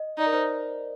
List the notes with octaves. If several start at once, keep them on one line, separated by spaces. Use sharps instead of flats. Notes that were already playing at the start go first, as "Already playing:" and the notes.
Already playing: D#5
D#4 D5
A#4
C5